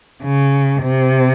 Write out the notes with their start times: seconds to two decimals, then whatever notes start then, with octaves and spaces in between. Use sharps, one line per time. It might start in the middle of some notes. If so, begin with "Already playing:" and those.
0.23 C#3
0.83 C3